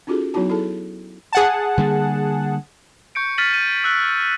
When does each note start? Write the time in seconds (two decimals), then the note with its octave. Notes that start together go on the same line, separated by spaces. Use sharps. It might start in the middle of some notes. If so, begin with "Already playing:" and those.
0.07 C#4 D#4 F4 F#4 G#4 A4
0.34 F#3 B3 D#4 E4 F#4 A5
0.50 E4 G#4 A4 A5
1.33 G#4 F#5 A5
1.78 D3 G3 A#3
3.15 C#6 G6 C#7 D7
3.38 F6 A6 B6 D#7 F#7
3.54 D#7
3.84 E6 F#6 B6